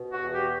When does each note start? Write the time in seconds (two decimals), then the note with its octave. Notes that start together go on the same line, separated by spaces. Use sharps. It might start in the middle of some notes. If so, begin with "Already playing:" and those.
Already playing: B2
0.13 F#4
0.23 E2
0.33 G4